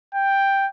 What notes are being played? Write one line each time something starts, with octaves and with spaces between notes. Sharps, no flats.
G5